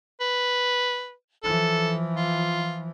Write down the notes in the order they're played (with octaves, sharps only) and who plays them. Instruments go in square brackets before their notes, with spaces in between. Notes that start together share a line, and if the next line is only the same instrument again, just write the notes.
[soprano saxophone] B4
[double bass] E3 F3 [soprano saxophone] A4
[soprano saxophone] F4